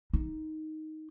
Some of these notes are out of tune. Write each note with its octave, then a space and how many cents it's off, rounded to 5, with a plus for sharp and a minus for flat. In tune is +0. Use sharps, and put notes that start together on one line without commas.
D#4 +5